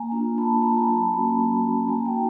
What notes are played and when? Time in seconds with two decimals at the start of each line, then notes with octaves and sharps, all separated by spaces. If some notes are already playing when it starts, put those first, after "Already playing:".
Already playing: A#3 G#5 A#5
0.12 D4 F4
0.37 A#3 A5 B5
0.62 D4 F4 A#5
0.71 B5
0.78 G#5 A#5
0.87 F#3 A5 B5
1.13 A#3 C#4 F#4
1.39 F#3
1.64 A#3 C#4 F#4
1.88 A#3 G#5 A#5
2.06 G5 A5
2.14 D#4 F#4